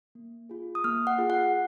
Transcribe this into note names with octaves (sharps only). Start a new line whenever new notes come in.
A#3
F4 G#4
D#6
A#3 F6
F#5
F4 G#4
F#5